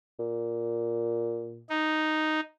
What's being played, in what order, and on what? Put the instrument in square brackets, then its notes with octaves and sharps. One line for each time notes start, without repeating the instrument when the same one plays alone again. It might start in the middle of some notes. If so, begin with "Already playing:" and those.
[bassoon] A#2
[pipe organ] D#4